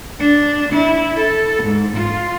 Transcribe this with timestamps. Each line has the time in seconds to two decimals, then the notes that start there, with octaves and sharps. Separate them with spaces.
0.20 D4
0.74 E4
1.17 A4
1.64 G#2
1.97 F4